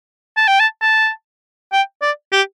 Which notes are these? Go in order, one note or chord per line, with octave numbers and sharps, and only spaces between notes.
A5
G5
A5
A5
G5
D5
G4